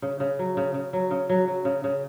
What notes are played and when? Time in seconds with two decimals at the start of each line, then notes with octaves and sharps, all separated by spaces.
0.02 C#3
0.20 C#3
0.39 F#3
0.57 C#3
0.74 C#3
0.93 F#3
1.11 C#3
1.29 F#3
1.48 F#3
1.65 C#3
1.84 C#3